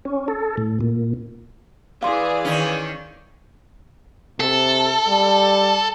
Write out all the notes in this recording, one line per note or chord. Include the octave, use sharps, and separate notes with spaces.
C#4
A4
A2
A#2
E3 G#4 D5 F5 C6
D#3 C#4
C3 A4
G3